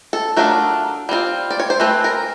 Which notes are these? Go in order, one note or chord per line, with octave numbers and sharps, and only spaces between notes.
A4
F#3 A3 D4 F4 A#4
G3 C4 F4
D5
C#5
C5
E3 A3 C4 B4
A#4